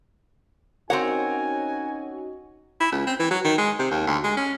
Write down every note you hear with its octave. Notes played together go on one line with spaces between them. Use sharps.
C4 C#4 D#4 F#4 A#4 C#5 F#5 G#5
E4
C#2
C4
E3
F#3
D#3
G#3
C3
D#2
D2
G#3
C#4